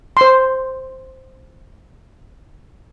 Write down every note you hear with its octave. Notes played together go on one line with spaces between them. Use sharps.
C5 C6